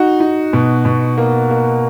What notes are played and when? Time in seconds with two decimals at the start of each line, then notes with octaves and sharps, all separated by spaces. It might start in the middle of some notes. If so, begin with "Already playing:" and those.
Already playing: D#4 F#4
0.20 D#4
0.53 B2
0.85 B2
1.18 A#3
1.51 A#3